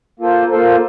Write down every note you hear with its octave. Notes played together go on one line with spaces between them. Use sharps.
A#3 F4 A4 C5
A#3 F4 A4 C5